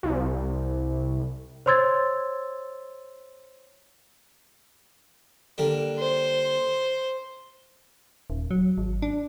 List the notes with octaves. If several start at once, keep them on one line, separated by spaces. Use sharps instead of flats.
C2
C5 C#5 C6 E6 G#6 A6
D3 G3 A#3
C5
D#1
F#3
G#1
D4